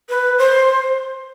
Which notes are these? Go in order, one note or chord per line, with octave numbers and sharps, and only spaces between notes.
B4
C5